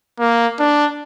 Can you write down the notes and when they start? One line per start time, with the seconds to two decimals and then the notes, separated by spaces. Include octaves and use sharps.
0.20 A#3
0.59 D4